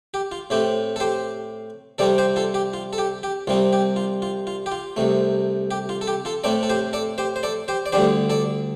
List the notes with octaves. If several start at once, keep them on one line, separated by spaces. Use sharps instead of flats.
G4
F4
A2 A3 C4 G4
A4
G4 C5
C3 G3 C4 A4 D5
G4 C5
F4 A4
G4
F4
A4
G4
G4
C2 C3 G3 C4 F4
G4
F4
F4
F4
G4
F4
C2 C3 A3
G4
F4
A4
G4
F4 A4
A2 A3 C4 A4 D5
A4
G4 C5
A4 D5
G4 C5
C5
A4 D5
G4 C5
D5
D2 D3 G3 D4 G4 C5
A4 D5